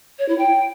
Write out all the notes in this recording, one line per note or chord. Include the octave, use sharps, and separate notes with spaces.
C#5
E4
G5